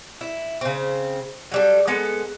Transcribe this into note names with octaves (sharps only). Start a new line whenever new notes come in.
E4
C#3 C4
F#3 G3 A4
G#3 B3 A4